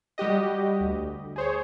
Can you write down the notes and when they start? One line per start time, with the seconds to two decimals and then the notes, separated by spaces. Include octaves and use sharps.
0.18 G3 F#4 G4 D#5
0.80 D2
1.36 G#4 C5 C#5